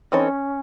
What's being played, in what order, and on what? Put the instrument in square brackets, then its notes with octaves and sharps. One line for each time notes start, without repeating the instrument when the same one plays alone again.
[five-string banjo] E3 C4 D#4 A4 C#5 [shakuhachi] C#4